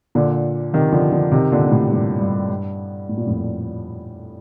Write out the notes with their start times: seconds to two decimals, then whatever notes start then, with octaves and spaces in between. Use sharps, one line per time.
0.15 A#2 D3
0.73 C3 D#3
0.92 D3 F3
1.12 D3 F3
1.32 C3 D#3
1.52 A#2 D3
1.66 A#2
1.71 A2 C3
1.90 G2 A#2
2.20 G2
2.49 G2
3.09 A2
3.17 A#2
3.27 F2 A2